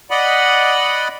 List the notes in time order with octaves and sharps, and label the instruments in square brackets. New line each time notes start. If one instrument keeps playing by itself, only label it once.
[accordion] D5 D#5 F#5 B5